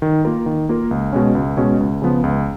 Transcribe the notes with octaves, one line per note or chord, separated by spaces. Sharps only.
D#3
A#3 F4 A#4
D#3
A#3 F4 A#4
C#2
B2 G#3 C#4
C#2
B2 G#3 C#4
C#2
C#3 F3 B3
C#2